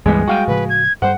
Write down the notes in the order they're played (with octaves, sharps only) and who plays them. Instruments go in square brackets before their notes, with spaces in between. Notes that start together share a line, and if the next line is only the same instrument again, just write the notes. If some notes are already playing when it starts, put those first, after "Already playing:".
[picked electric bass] C#2 G2 [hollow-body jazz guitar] E3 G3 B3 [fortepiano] G#3
[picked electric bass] G3 [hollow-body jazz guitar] F#4 F5 G#5 [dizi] G5
[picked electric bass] A2 C#3 F3 [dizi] B4
[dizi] G#6
[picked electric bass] G2 G3 [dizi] C5 [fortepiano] F#5